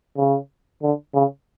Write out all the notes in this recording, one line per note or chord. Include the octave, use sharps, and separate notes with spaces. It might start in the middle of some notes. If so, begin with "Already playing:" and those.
C#3
D3
C#3